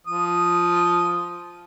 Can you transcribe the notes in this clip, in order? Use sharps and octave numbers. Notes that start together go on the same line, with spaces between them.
F3 D#6